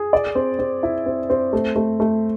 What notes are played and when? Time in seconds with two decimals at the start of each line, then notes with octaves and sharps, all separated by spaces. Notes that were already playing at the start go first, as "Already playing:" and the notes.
Already playing: G#4
0.13 D5
0.35 C4
0.59 C4
0.83 E4
1.06 C4
1.30 C4
1.53 A3
1.76 A3
2.00 A3